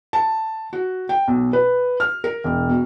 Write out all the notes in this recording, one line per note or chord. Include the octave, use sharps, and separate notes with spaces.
A5
F#4
G5
B1
B4
F6
A#4
E1
B2